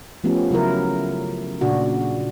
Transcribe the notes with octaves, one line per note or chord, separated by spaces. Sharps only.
F3 A3 B3 C#4 G4
C#3 F#3 E4 A#4
A#2 C#3 D4 F#4